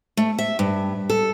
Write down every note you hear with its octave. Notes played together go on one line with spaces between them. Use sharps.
A3
E5
G2
A4